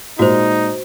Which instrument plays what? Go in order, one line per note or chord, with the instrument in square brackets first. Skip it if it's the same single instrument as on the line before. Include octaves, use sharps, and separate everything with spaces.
[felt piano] A#2 G#3 [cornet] D#4 [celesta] F#4 C5